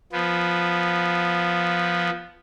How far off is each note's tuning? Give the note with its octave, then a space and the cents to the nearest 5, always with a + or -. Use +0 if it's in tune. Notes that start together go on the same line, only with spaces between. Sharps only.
F3 +0 B3 -5